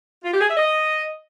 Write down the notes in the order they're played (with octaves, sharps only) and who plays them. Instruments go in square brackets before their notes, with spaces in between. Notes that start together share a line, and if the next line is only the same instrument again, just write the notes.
[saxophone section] F4
G4
G#4
E5
D#5